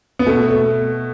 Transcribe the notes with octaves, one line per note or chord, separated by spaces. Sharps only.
B3
B2 A3
A3